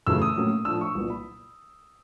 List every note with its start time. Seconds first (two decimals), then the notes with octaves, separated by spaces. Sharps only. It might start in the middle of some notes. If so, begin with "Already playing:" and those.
0.07 F#2 C#3 E3 A3 E6
0.22 D#6
0.36 A2 F#3 A#3 C#4
0.65 A2 F3 A3 D4 E6
0.81 C#6
0.95 C2 A#2 F#3 B3
1.10 B5